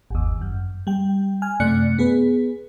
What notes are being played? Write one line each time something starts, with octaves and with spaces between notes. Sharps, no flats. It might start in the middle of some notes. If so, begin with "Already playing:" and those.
G1 D#2
F#2
G3 G5
G#5 F6
F#2 C3 A3 D5 F#6 C#7
B3 G#4 B4